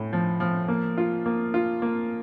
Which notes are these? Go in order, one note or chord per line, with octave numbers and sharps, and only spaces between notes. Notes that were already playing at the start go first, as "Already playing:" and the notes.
Already playing: A2
F3
F3
A#3
F4
A#3
F4
A#3